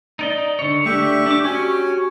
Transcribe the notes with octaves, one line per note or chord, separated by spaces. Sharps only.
D#4 D5 D#5
D3 C#5
A3 D4 G4 E5 C#6
D4 D6
C#4 F#4 G4 C#5 G#5